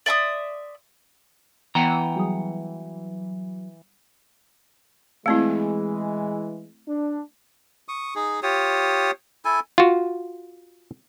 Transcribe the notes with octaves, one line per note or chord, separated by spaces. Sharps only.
D5 E5 C6 D#6
E3 B3 F#5 G5 A#5
F#3 G3 G#4 D#6
E3 G#3 A3 C4 E4
D4
C#6 D#6
D#4 G#4
F4 G4 C#5 D#6
E4 A4 G#5
F4 F#4